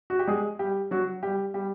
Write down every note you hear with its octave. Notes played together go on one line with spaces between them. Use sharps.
F#4
G4
G#3 G#4
G3 G4
F#3 F#4
G3 G4
G3 G4